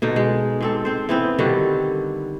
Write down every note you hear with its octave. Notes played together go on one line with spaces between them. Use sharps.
B2 D3 D#4
G#3
G#2 C4 A4
C4 C5
E3 B3 C4
D3 D#3 G3 F#4